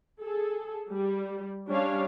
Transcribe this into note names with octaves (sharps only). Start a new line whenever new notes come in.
G#4 A4
G3
G3 C#4 D4 C#5 F5